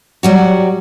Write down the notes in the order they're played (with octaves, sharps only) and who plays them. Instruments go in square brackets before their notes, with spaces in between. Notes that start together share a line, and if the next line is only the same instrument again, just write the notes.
[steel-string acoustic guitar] F#3 G3 F#4